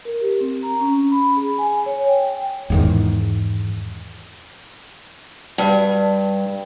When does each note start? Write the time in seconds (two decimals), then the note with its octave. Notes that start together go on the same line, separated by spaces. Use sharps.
0.05 A#4
0.21 G4
0.41 C4
0.63 A#5
0.80 C#4
1.11 B5
1.36 G#4
1.58 G#5
1.86 C#5
2.08 G5
2.70 E2 G#2 D#3
5.58 G2